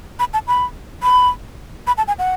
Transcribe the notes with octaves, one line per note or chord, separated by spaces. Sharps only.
B5
A5
B5
B5
B5
A5
G#5
F#5